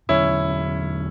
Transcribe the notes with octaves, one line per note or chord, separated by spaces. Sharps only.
E2 D3 F#3 C#4 E4